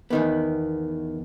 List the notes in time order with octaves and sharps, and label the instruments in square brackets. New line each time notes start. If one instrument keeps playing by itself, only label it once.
[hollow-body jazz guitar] E2 D#3 B3